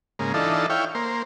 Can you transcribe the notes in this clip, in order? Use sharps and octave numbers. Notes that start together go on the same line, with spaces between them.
G#2 C#3 A#3
E3 D4 D#4 F4 A4
E4 C#5 F5 G5
A#3 C5